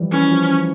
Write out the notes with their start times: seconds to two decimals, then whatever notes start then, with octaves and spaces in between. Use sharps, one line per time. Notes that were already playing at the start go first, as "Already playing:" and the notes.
Already playing: E3 F3 G3
0.12 E3 C#4
0.32 F3